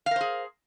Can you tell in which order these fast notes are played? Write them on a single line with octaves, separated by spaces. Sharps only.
F5 A#4 C5 G#4